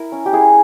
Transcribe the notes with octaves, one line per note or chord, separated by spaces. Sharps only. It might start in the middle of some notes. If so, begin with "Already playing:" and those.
Already playing: E4 A#4
C#4
G4
E4 G#4